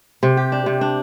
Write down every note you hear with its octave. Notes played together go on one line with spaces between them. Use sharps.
C3
G4
D4
C3
D4